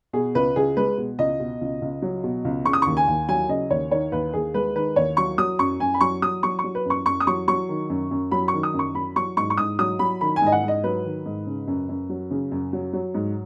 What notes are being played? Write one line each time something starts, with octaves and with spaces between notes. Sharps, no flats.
B2 G#4
C#2 B4
C#2 G#4
G#3 B4
B2
C#2 D#5
B2
C#2
C#2
F#3
B2
C#2
C#3 C#6
D#6
D#2 C#6
G#5
D#2
F#3 G#5
C#3 D#5
D#2 C#5
D#3 C#5
D#2 B4
D#2 G#4
G#3 B4
D#3 B4
D#2 C#5
F#3 C#6
F#3 D#6
F#2 C#6
F#2 G#5
B5
F#3 C#6
F#3 D#6
F#3 C#6
C#6
F#3
B4
F#2 C#6
F#2 C#6
D#6
F#3 C#6
F#3 C#6
D#3
F#2
F#2
F#3 B5
C#6
D#3
D#6
F#2
C#6
F#3 B5
F#3 C#6
G#2 C#6
C#6
G#2 D#6
F#3 D#6
F#3 B5
D#3 B5
G#5
G#2 D#5
F#5
G#2
D#5
F#3 B4
D#3
G#2
C#3
F#2
F#2
F#3
C#3
F#2
F#3
F#3
G#2